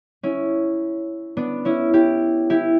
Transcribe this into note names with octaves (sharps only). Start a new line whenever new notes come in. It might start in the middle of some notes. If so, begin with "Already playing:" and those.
C#4 E4
B3 D4
C#4 E4
E4 G4
E4 G4